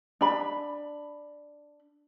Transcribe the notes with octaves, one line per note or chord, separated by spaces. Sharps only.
D4 B5